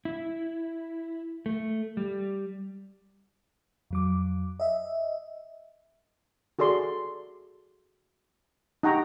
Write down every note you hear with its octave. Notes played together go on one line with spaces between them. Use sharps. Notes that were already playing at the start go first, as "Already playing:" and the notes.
E4
A3
G3
F2 F#3 D6
D#5 E5
F#4 G#4 A4 D5 C6
D#4 G4 F#5 G5 A#5 C#6